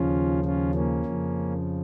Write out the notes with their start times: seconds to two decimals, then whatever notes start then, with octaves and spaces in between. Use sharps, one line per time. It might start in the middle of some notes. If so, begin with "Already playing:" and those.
Already playing: D#2 C#3 F3 C#4 F4
0.45 C#4 F4
0.75 A#3 C#4
1.05 F2 C#3 F3